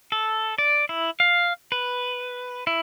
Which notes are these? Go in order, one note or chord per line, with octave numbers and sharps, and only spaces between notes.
A4
D5
E4
F5
B4
E4